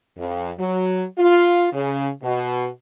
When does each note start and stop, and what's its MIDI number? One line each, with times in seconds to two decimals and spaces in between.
0.18 0.51 41
0.59 1.04 54
1.18 1.68 65
1.73 2.09 49
2.23 2.67 47